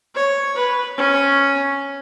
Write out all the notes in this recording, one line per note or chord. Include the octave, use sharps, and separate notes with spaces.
C#5
B4
C#4